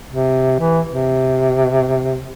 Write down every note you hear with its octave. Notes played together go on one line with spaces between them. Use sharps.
C3
E3
C3